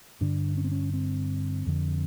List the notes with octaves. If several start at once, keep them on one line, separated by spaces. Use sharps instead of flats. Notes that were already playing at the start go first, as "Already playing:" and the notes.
G2 D3 D4
C#4
C4
C#4
C4
F2 D3